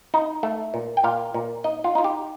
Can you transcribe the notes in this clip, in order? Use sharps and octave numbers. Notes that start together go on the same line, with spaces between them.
D#4
A3
A#2
G5
A#2 F5
A#2
D#4 D#5
F4
D#4 F4
G4